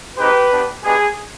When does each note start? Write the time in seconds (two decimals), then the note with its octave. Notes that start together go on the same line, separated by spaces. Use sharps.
0.18 G#3 C4 D#4 G4 B4
0.51 B3 D4 G4
0.84 G#3 B3 D4 G4 G#4